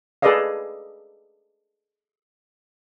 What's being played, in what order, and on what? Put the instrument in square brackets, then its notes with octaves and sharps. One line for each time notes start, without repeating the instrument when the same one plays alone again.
[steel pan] G#4 A4 B4 D5 D#5 F5